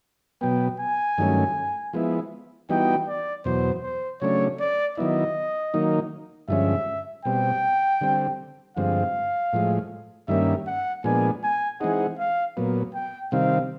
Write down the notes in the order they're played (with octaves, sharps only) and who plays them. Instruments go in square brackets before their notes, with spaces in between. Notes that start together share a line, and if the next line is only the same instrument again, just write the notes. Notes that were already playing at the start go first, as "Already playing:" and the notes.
[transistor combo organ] B2 F#3 B3 [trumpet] G5
[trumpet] G#5
[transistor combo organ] G2 D#3 F#3 A3 C#4
F3 G#3 B3 E4
[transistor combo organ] E3 G3 B3 D#4 F#4 [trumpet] G5
[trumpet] D5
[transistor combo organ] E2 B2 F#3 [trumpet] C5
[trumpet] C5
[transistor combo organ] C#3 F#3 A3 D4 [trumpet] C#5
[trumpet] D5
[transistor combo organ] D#3 F#3 B3 E4 [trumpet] D#5
[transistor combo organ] D#3 F#3 A#3 D#4
[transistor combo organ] G2 D3 F3 G#3 C#4 [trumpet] E5
[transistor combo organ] B2 G3 C4 [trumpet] G5
[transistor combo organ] D3 G3 C4
[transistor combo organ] G2 D3 F3 G#3 C4 [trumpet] F5
[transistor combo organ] A2 F3 G#3
[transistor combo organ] G2 D#3 G3 A#3 C#4 [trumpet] E5
[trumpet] F#5
[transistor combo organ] A#2 F3 G#3 B3 D4 [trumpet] G#5
[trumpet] G#5
[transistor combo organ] E3 G#3 C4 D#4 G#4 [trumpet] F#5
[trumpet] F5
[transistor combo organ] A#2 F#3 B3
[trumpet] G5
[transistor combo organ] C3 D#3 G3 C4 [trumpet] F5